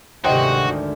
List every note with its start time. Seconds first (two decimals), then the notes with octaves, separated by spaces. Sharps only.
0.24 G#1 D2 C3 F#4 C5 D#5 G5